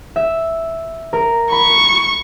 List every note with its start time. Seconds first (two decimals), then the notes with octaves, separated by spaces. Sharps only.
0.16 E5
1.13 A#4
1.52 B5 C#6